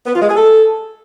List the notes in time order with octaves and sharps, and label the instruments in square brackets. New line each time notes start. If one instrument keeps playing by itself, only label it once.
[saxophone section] B3
F4
G#3
G#4
A4